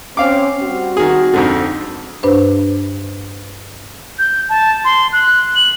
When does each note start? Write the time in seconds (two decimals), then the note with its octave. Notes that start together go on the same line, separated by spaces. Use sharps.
0.17 C4 C#4 F5 D6
0.62 G3 C4 F#4
0.97 D#3 G#4
1.33 F2 G#2 D3
2.23 G2 D4 B4 C5
4.19 G6
4.49 A5
4.85 C6
5.13 F#6
5.56 F#7